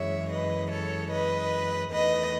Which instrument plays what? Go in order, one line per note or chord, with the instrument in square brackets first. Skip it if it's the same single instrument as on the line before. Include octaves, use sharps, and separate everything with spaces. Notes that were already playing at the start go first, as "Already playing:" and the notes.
Already playing: [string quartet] F#2 E3 G#3 C#5 E5
B4 D#5
A4 C#5
B4 D#5
E2 D#3 A3 B4 D#5